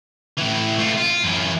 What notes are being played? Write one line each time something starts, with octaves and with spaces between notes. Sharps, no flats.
A2 E3
A3 F4
F4
F#2 E3